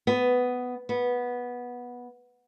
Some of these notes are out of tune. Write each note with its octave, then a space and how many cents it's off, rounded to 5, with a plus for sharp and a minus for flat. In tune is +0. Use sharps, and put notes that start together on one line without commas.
B3 +10
B3 -10